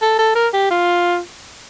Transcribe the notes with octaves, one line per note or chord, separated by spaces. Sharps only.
A4
A4
A#4
G4
F4